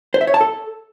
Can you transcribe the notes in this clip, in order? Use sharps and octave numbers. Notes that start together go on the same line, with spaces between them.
C5
E5
C#5
A5
A4